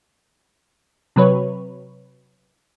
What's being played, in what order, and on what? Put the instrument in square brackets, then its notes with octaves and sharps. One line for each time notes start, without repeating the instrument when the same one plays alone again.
[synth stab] C3 F#3 B4 C#5